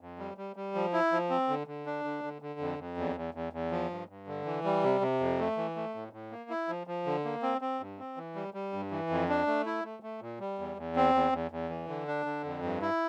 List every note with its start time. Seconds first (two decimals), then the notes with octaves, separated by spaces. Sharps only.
0.01 F2
0.19 G3
0.37 G3
0.56 G3
0.75 F3
0.93 E4
1.12 F3
1.30 C4
1.49 D3
1.67 D3
1.86 D4
2.04 D3
2.23 D3
2.42 D3
2.60 F2
2.78 F2
2.97 E2
3.16 E2
3.34 E2
3.53 E2
3.71 F3
3.90 G2
4.09 G2
4.27 D3
4.45 E3
4.64 G3
4.83 C3
5.01 C3
5.20 F2
5.39 A3
5.57 E3
5.76 A3
5.94 A2
6.13 A2
6.31 A#3
6.50 E4
6.68 F3
6.87 F3
7.06 D3
7.25 A#3
7.43 C4
7.61 C4
7.80 G2
7.98 C4
8.17 E3
8.35 G3
8.54 G3
8.73 G2
8.91 E3
9.10 F2
9.29 D4
9.47 A3
9.66 E4
9.84 A3
10.03 A3
10.21 A#2
10.40 G3
10.58 E2
10.78 E2
10.96 C4
11.15 E2
11.33 E2
11.51 E2
11.69 E3
11.88 D3
12.07 D4
12.26 D3
12.44 F2
12.63 G2
12.82 E4